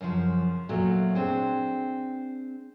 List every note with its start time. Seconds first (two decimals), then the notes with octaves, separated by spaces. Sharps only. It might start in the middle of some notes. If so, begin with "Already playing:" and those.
0.01 F#2 C#3 E3 F3
0.69 A#2 F#3 A3 B3
1.15 C4 D4 G#4 C5